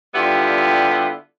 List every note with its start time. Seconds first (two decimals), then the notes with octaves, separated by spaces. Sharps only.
0.15 D3 G3 B3 E4 F4 G4